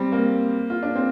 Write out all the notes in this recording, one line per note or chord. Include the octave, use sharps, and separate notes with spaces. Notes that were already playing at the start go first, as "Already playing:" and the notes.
Already playing: G3 C4
A#3
F4
D4
C4